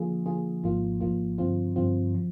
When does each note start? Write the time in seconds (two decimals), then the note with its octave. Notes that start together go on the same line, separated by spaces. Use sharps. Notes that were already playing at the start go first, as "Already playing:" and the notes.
Already playing: D3 F3 A#3 F4 G#4
0.26 D3 F3 A#3 F4 G#4
0.63 G#1 G#2 F3 A#3 F4
1.01 G#1 G#2 F3 A#3 F4
1.38 G2 D3 F3 C4 F4
1.76 G2 D3 F3 C4 F4
2.15 F3